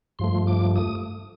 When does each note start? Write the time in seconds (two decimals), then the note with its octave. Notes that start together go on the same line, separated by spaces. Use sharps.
0.19 G2 F3 A3 C6
0.47 D6
0.76 D#6